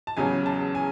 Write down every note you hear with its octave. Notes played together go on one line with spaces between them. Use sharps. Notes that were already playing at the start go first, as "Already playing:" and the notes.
A5
E2 C#3 F#3 G#5
A5
G#5